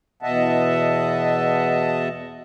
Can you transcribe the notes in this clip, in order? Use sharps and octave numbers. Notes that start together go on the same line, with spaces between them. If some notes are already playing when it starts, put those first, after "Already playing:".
E2 B2 D#5 E5 F#5 A5